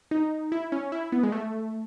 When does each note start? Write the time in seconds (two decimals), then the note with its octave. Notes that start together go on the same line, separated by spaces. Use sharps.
0.11 D#4
0.52 E4
0.72 C#4
0.92 E4
1.12 B3
1.23 G#3
1.32 A3